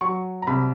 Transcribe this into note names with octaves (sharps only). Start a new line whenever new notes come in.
F#3 C#6
A#5
C2 B5